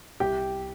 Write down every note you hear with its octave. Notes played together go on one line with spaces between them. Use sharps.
C2 G4 G5